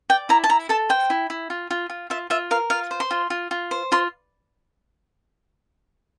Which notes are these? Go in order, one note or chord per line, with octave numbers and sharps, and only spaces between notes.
D5 G5
E4 A#5
A5
E4 A#5
A4 A5
C5 G5
E4
E4
F4
F4
F4
F4 E5
F4 E5
A#4 F5
F4 F5
C5
C6
F4
F4
F4
C5
F4 C6